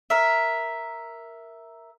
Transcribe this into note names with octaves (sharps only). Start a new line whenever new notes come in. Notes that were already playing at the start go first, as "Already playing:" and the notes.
A#4 E5